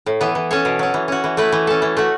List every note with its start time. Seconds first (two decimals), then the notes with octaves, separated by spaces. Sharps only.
0.06 A2
0.21 E3 B3
0.35 E3
0.51 C#4 A4 C#5
0.65 B2
0.79 F#3 C#4
0.94 E3
1.08 C#4 F#4
1.24 E3
1.37 A3 E4 B4
1.52 E3
1.67 C#4 A4
1.82 E3
1.97 A3 F#4